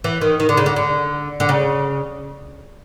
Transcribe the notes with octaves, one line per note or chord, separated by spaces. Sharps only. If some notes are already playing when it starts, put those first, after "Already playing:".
E3
D#3
D#3
D3
C#3
D3
D3
D3
C#3